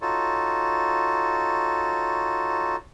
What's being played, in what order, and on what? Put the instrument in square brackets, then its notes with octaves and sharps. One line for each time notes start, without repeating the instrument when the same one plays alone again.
[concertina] D#4 F4 F#4 A4 C#5